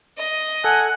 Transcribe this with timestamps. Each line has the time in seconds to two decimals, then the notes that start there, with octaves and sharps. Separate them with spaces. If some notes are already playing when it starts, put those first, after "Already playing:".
0.18 D#5
0.64 A4 F#5 G#5